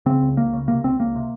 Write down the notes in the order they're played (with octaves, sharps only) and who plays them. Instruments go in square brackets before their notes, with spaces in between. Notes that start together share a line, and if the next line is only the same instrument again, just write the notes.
[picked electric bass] C#3 C4
C#2
C#2 A#3
C#3
C3 A#3
C#2 C4
C#2 A#3
C3